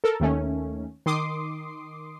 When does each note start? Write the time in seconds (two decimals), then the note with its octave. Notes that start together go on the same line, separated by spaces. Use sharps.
0.04 A4 A#4
0.20 D#2 D#3 A3 C#4
1.06 D#3 C6 D6 D#6 C7